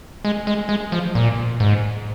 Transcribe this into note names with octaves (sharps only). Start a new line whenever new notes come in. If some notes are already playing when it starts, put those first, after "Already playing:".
G#3
G#3
G#3
F3
A#2
G#2